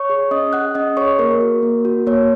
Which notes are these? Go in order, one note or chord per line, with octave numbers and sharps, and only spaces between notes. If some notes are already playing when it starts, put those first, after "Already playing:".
Already playing: C#5 C#6
G#4
C#4 D#5 D#6
G#4 F#5 F#6
C#4 D#5 D#6
G#4 C#5 C#6
A#3 A#4
F#4
A#3
F#4
A#3 C#5